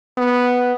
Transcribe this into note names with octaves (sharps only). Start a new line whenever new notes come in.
B3